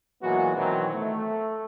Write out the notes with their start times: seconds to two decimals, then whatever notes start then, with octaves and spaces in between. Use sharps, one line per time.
0.22 A#2 E3 F#3 G#3 B3 F#4
0.56 B2 D#3 E3 F#3 C4
0.93 A3